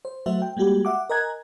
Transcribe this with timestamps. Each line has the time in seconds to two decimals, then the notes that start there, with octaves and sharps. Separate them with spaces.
0.05 C5
0.26 F#3 A3 F#4 C5 E5
0.42 G5
0.57 G3 G#3 A#3 F#4 G4
0.85 E5 F#5 D6
1.09 A#4 D#5 G#5 A#5 F#6 G#6